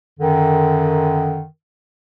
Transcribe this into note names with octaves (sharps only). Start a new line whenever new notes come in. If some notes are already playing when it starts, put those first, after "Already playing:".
F#2 D3 D#3